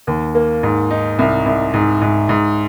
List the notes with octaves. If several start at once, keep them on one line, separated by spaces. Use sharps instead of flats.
D#2
A#3
G#2
D#4
C2
C2
G#2
G#2
G#2